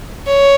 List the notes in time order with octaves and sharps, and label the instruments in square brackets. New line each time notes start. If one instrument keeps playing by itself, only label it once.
[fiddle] C#5